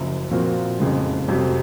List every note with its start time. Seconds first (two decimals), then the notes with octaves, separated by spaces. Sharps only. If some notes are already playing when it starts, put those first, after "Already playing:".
Already playing: F#1 F#2 C#3 F3
0.31 A#2 F3 C4 F#4 A#4
0.80 F#1 F2 C#3 G#3
1.28 F1 F2 C3 F#3